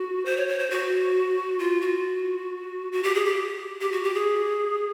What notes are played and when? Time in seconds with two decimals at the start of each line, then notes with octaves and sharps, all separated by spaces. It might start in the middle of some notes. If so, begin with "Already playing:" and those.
Already playing: F#4
0.25 C5
0.37 C#5
0.48 C#5
0.59 C5
0.70 F#4
1.59 F4
1.81 F#4
2.92 F#4
3.03 G4
3.15 G#4
3.25 G4
3.81 G4
3.92 F#4
4.03 G4
4.14 G#4